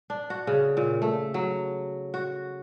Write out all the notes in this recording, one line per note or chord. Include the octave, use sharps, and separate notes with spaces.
D4
F#4
C#3
A#2
A3
F#3
F#4